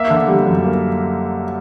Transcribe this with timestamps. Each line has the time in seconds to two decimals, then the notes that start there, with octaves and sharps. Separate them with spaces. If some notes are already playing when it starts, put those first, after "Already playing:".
Already playing: A#3 E5
0.10 D3
0.28 G3
0.46 F#2
0.64 A#3